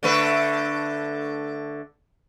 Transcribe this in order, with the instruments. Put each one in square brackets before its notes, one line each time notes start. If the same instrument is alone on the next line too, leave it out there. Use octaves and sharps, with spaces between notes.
[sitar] D3 A3 B4